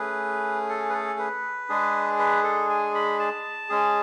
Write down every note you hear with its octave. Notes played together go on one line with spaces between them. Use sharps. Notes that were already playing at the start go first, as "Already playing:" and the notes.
Already playing: A3 C#4 G#4 B4
A4
B4
A4
B4
G#3 D4 G#4
B4
A4
G#5
B5
A5
G#3 C#4 G#4